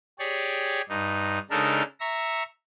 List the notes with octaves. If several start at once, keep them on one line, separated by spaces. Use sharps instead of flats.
G4 G#4 C#5 D5
G2 D#4
C#3 G#3 D4 D#4 A4 A#4
E5 A#5 C#6